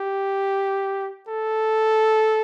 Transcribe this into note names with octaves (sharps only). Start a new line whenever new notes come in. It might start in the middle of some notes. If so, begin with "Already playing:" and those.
Already playing: G4
A4